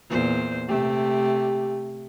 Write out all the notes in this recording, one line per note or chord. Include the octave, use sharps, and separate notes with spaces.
E2 A#2 C5
C3 A3 G4